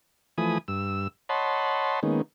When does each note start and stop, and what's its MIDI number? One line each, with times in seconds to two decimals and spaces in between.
0.38 0.58 52
0.38 0.58 53
0.38 0.58 57
0.38 0.58 80
0.38 0.58 83
0.38 0.58 87
0.68 1.08 43
0.68 1.08 88
1.29 2.00 73
1.29 2.00 75
1.29 2.00 78
1.29 2.00 81
1.29 2.00 83
1.29 2.00 84
2.03 2.22 51
2.03 2.22 56
2.03 2.22 58
2.03 2.22 59
2.03 2.22 61
2.03 2.22 63